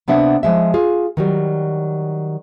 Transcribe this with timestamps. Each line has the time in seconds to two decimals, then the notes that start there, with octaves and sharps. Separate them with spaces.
0.08 C3 B3 D4 E5 F#5
0.43 F3 G#3 E5
0.74 F4 G#4
1.17 D#3 F#3 G3